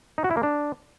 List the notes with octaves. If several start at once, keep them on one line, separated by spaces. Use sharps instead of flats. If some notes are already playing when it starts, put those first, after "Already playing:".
D#4
F#4
E4
A#3
D4